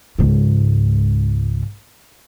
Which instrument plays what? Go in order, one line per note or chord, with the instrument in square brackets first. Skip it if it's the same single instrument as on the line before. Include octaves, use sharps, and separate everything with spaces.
[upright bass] C#2 G#2